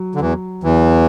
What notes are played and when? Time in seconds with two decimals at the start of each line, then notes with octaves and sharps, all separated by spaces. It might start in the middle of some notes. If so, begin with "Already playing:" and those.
Already playing: F#3
0.15 D3
0.21 E2 E3
0.64 E2 E3